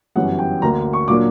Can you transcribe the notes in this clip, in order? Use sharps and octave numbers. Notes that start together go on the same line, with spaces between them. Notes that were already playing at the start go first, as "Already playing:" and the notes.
G1 F#2 E3 G3 C#4 F#5
G5
D2 D3 A#3 D4 A#5
C#6
A#2 F#3 A#3 D4 D6